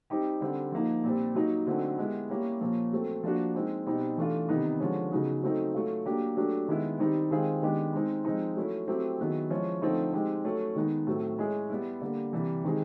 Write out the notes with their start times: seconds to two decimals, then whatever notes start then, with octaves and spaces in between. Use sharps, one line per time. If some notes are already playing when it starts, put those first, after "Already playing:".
0.10 G3 C4 D#4 G4
0.41 D3 G3 C4
0.72 F3 A#3 D#4
1.04 A#2 G3 C4
1.35 F#3 A#3 D#4
1.67 D3 F#3 A3 C4 D#4
1.98 G#3 B3 E4 G4
2.29 G3 A#3 C#4 E4 G4
2.61 A#2 F3 A#3 C#4
2.92 F#3 A3 C4
3.23 F3 A#3 D4 F#4
3.55 G#3 C4 D#4
3.86 B2 G3 C4 D#4
4.17 E3 A3 D4 F4
4.49 C3 D#3 G3 B3 D#4
4.80 D3 F3 G#3 C#4
5.12 C#3 F#3 B3 D#4 G#4
5.42 F#3 A3 C4 D#4
5.74 F#3 A3 C#4 F4
6.05 F#3 A#3 D4 G4
6.37 F#3 A3 D4 G4
6.68 D#3 G#3 B3 E4
6.99 D#3 G3 C4 D#4
7.31 D#3 G#3 C4 F4 G#4
7.62 D#3 G#3 B3 D4 G4
7.93 G#3 C4 D#4
8.25 F3 G#3 C4 D#4
8.56 F#3 A3 C#4 E4
8.88 F#3 A3 C4 E4 G4
9.19 D#3 F#3 B3 E4 G#4
9.50 F3 G#3 C#4 E4
9.82 D3 F3 A3 C4 D#4
10.14 G#3 C4 D#4 G4
10.45 F#3 A3 C#4
10.76 D#3 G#3 B3 D#4
11.07 A2 F#3 A3 C4
11.39 G#3 C#4 E4 G#4
11.70 G3 B3 E4
12.02 D3 G3 A#3
12.32 C3 E3 G3
12.64 D#3 G#3 C4 D#4 G#4